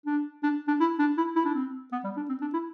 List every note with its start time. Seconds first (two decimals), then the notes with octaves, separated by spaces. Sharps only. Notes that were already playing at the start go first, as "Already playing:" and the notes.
0.06 D4
0.43 D4
0.68 D4
0.80 E4
0.99 D4
1.17 E4
1.36 E4
1.45 D4
1.54 C4
1.92 B3
2.04 G3
2.17 D4
2.29 C4
2.42 D4
2.53 E4